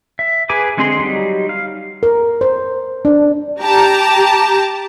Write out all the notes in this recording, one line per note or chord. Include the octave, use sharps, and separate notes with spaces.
E5
G#4 B4 G#5 D6
D3 G#3 C4 G#4 C6
F#3 G3 D#4
F5
A#4
C5
D4
G4 A5 A#5